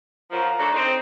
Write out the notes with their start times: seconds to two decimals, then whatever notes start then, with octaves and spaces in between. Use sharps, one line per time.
0.31 F#2 F3 A#5
0.59 F#3 A3 D4
0.74 C4 D#4